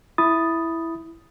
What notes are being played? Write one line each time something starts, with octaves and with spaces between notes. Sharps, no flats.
E4 B5 D#6 A6